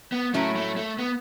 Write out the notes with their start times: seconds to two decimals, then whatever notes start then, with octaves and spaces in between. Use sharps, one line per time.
0.12 B3
0.34 A2 F#3 A3 C#4 E4
0.56 A3
0.77 A3
0.99 B3